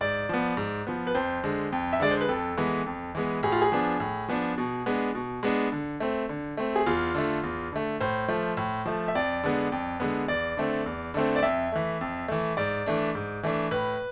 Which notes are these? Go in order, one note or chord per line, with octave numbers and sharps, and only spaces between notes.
G#2 D5
F3 B3
G#2
F3 B3
B4
F2 C5
D3 G#3
F2
E5
D3 G#3 D5
C5
B4
F2 A4
E3 G#3 B3
F2
E3 G#3 B3
A2 G#4
F4
G#4
F3 B3 D4
A2
F3 B3 D4
B2
G#3 B3 D4
B2
G#3 B3 D4
D3
A3 C4
D3
A3 C4
G#4
E2 F4
D3 A3
E2
D3 A3
A2 C5
F3 A3
A2
F3 A3
E5
F2 D5
D3 G#3 B3
F2
D3 G#3 B3
E2 D5
D3 A3 C4
E2
D3 A3 C4
D5
F2 E5
E3 A3
F2
E3 A3
G#2 D5
E3 A3 D4
G#2
E3 A3 D4
A2 B4